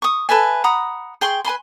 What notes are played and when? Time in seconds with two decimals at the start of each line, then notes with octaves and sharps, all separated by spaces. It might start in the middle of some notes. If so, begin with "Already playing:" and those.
0.02 C#6 D#6
0.29 A4 B4 E5 G#5
0.64 F#5 A#5 B5 D#6
1.21 G#4 G5 C6 C#6
1.45 B4 G#5 B5 C6